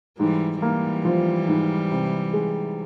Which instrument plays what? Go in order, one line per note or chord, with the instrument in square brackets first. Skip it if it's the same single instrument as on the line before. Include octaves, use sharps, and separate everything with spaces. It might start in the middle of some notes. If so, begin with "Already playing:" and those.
[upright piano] G#2 [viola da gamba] E3 G3
[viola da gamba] E3 G3 [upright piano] A#3
[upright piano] F3
G#2
C3
G#3